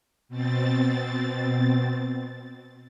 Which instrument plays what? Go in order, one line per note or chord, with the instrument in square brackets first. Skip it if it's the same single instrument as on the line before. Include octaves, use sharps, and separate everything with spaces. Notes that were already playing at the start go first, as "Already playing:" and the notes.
[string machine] B2 C4 A6